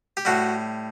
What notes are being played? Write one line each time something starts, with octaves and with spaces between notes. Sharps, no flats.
G4
A2 G3 F#4